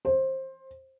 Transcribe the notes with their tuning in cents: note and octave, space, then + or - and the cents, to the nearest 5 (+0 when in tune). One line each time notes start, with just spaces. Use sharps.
C5 +20